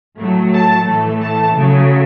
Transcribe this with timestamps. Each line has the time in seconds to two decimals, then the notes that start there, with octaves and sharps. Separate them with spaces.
0.19 A2 F#3 A3
0.53 A5
0.87 A2 E3 A3
1.21 A5
1.56 C#3 F#3 A3